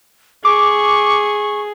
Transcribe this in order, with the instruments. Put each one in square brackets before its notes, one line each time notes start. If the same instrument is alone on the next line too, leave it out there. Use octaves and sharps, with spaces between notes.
[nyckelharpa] G#4 [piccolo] C#6 [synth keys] D6